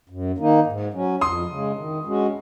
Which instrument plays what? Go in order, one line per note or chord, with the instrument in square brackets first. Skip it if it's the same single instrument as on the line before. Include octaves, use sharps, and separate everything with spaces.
[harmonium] F#2
D#3 A#3 D#4
G#2
F#3 C#4
[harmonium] F2 [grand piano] C6 D#6
[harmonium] C#3 G#3
D#3
G#3 C#4 F#4